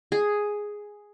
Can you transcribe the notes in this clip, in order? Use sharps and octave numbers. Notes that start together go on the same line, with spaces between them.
G#4